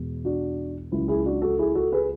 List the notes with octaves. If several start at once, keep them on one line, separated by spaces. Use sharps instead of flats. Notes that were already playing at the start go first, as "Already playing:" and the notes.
Already playing: E2 B2 G#3
D4 F#4
C#2 C#3 F#3 E4
E4 G#4
D4 F#4
F#4 A4
E4 G#4
F#4 A4
G#4 B4